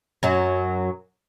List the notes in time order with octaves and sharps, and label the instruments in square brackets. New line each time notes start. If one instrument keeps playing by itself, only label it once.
[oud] F#2 F#3